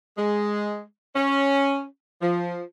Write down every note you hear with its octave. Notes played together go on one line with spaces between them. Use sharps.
G#3
C#4
F3